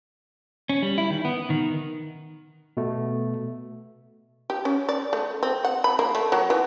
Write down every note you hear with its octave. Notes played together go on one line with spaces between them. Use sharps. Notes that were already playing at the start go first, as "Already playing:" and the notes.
C#4
G3
E4
D#3
B3
D#3
B2 A3
G4
C#4
D5
A3
C4
F#5
B5
A#3
A3
F#3
E3